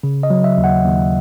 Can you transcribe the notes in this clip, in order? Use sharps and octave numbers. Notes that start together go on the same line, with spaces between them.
C#3
D#5
F#3
E5
D#2
F#5
D#2